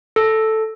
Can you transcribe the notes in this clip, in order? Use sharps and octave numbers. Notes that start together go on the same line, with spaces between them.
A4